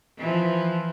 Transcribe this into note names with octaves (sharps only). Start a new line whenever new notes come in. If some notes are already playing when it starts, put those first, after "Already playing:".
E3 F3